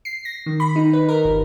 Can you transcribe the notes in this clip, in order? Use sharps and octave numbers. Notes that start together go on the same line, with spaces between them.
C7
A#6
D#3
B5
D#4
B4
A#4
G1